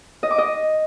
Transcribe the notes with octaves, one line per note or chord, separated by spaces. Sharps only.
D#5
D6
D#5